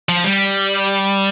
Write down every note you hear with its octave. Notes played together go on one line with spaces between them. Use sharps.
F3
G3